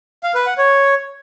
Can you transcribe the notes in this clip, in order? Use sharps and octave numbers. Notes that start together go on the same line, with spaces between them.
F5
B4
F#5
C#5